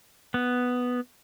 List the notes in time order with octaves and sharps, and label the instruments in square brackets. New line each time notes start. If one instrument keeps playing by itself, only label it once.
[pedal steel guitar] B3